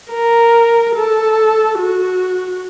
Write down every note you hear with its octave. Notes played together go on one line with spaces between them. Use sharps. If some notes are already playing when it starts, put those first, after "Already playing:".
A#4
A4
F#4